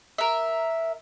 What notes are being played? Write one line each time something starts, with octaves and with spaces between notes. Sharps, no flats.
A#4 E5